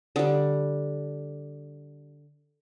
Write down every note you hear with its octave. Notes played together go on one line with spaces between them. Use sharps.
D3 G3